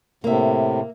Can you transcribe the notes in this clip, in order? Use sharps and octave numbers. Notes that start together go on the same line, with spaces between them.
A2 C3 A#3 E5